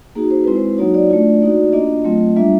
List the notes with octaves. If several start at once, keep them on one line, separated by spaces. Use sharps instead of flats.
A#3 D#4 F#4 G#4
C5
G#3 C4 E4 B4
C5
F#3 A#3 D#4 F#4 C#5
D5
A3 D4 F4
A#3 D#4 F#4
A#3 D4 F4 D#5
F#3 A3 C4 F4
G3 A#3 D4 F4 E5